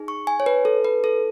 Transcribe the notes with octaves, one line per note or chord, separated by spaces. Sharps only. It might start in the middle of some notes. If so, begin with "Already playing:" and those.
Already playing: D#4 G#4
C#6
G#5
C#5
B4
A4
B4
A4